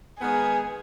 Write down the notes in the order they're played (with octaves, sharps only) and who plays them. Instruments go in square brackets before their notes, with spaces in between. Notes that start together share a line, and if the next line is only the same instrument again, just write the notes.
[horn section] D#3 G#3 B3 [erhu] G#4